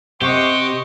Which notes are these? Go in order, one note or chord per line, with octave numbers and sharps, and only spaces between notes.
C3 G4 C5 D#5 F#5 C#6